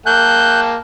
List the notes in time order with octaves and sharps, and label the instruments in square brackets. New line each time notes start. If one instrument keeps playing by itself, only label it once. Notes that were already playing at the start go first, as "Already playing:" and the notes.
[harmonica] A#3 G5 A5 [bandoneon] F#6 G6